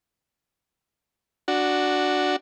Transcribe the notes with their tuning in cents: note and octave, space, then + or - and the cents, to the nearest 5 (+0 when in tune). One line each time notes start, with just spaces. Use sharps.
D4 +0 F#4 +0